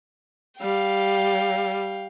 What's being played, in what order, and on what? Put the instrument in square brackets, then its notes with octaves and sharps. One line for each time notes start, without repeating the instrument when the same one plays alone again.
[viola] G3 [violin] F5 G5